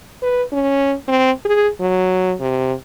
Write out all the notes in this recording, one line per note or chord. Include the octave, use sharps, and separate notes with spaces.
B4
C#4
C4
G#4
F#3
C3